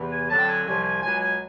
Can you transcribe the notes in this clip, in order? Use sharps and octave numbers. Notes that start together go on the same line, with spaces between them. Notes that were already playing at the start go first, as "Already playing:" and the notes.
Already playing: E2 C3 E3
G#5
F2 D3 F#3 A5
G5
G#5
C2 C3 F3 G#5
G#5
C#2 B2 F#3 G#5
G#5